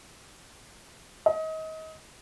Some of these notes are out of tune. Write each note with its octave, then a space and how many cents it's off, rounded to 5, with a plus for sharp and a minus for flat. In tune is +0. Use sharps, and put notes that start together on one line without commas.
D#5 +30